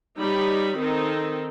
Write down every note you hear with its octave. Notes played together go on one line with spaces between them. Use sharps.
G3 D#4 C#5 B5
D#3 C4 D#4 A4